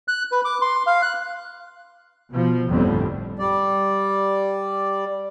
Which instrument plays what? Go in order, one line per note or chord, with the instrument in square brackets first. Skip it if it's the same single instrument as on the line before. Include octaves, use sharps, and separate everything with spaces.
[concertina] F#6
B4
D6
C6
F5
F#6
[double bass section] B2 F3
G1 F2 A2 D3 G3 C4
[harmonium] G3 D5